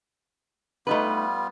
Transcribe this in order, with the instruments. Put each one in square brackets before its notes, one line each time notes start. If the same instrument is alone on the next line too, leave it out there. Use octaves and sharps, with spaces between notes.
[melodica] G3 B3 F4 [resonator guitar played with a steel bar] A3 D#4 B4